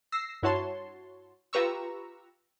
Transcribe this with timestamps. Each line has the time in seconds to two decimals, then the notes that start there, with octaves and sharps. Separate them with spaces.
0.12 E6 A#6 C7
0.43 G2 E4 F#4 C#5 A5 C6
1.53 F4 G4 B4 A#5 C#6 E6